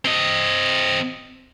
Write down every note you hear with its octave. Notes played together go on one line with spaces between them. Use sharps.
C4 D#5